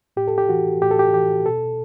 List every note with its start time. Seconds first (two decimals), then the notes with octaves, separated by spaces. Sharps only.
0.17 A2 G4
0.28 A4
0.38 G4
0.49 E3 F#4
0.82 A2 G4
0.91 A4
0.99 G4
1.14 E3 G4
1.46 B2 A4